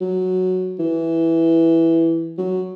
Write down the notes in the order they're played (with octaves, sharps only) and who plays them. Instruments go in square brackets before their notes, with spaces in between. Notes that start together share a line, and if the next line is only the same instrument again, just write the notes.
[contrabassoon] F#3
E3
F#3